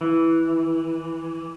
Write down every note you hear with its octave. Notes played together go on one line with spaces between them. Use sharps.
E3